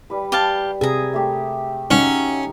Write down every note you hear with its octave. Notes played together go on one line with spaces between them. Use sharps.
G3 B4
G4 F5 A5
C3 G#4 E5 A#5
A3 G4
C#4 D#4 F#4 E5